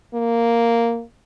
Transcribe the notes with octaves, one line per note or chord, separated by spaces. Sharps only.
A#3